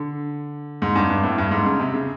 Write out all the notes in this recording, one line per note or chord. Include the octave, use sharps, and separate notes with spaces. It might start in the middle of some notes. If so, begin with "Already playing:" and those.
Already playing: D3
G#2
G2
G2
A2
G2
G#2
C#3
C3
C#3